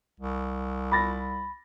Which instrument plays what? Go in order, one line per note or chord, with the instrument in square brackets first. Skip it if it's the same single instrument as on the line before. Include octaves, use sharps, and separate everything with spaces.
[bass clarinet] C2
[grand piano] B5 A6 A#6